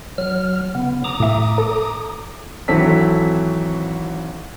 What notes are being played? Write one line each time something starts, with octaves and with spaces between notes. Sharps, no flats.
F#3 F6
C#3 B3
A#5 D6 D#6
A2 E5
A4
G#1 E3 F#3 C4 A4 B6